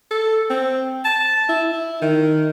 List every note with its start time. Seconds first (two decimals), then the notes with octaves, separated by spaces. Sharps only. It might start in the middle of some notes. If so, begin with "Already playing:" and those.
0.11 A4
0.50 C4
1.05 A5
1.49 E4
1.72 E4
2.02 D#3